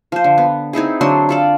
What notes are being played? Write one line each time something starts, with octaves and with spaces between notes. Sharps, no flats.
F3 C5
D3
B3
C4 D#4 E4 G#4
D3 F#3 D4 C6
F4 A4 D5